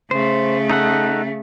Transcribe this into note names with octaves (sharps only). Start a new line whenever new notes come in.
C#3 A3 C5
D#4 A4 F#5